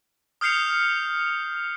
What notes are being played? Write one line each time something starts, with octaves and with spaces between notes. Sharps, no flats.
D#6 F6 G6 C7 C#7 F7